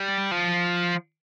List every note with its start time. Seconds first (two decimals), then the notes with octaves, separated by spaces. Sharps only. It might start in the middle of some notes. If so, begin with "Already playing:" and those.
Already playing: G3
0.31 F3